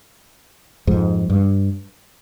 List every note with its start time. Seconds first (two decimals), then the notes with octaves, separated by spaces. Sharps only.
0.87 F2 G#2
1.30 G2